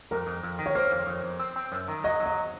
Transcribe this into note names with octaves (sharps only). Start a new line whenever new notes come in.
F2 A#4
F2
F2
D#3
C#5
A#3 C5
F2
F2
F2
C4
C4
F#2
D#3
F#3 D#5
F#3
D#5